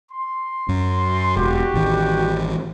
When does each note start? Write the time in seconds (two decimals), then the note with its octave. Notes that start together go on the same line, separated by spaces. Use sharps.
0.12 C6
0.69 F#2
1.36 E1 F#4 G4
1.74 A1 D#3